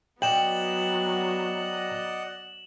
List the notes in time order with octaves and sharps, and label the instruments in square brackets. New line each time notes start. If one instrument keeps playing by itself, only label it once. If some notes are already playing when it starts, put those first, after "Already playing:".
[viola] F#3 B3 [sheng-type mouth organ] D5 D#5 F#5 [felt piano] G5 [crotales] E7 F#7